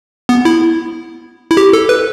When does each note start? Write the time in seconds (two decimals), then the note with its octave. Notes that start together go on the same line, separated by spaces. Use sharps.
0.29 B3
0.45 E4
1.51 E4
1.57 G4
1.73 A4
1.89 B4